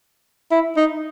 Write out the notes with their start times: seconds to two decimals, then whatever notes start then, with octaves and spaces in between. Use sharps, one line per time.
0.51 E4
0.77 D#4